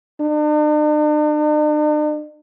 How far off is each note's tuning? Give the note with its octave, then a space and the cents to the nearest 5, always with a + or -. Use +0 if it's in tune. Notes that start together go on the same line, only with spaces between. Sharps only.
D4 +45